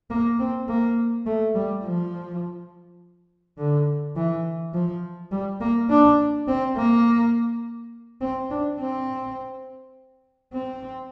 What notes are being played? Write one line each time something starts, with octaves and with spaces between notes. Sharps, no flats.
A#3
C4
A#3
A3
G3
F3
D3
E3
F3
G3
A#3
D4
C4
A#3
C4
D4
C4
C4